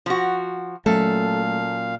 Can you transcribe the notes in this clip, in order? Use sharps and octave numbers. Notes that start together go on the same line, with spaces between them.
F3 F#4
A#2 F#3 A3 C#4 A4 F5